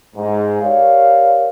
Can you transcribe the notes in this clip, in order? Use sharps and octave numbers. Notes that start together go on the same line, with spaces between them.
G#2
G4 A#4 C#5 D5 F5